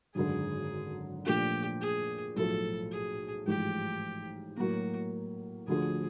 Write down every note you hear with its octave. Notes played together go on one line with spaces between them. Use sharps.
G#1 F#2 D3 G#4
A#2 F3 A3 D4 F4 G4
G#4
B1 A2 F3 A3 A4
G#4
A1 G#2 F3 G#3 G4
A2 F#3 A#3 F#4
D2 D3 F3 G#4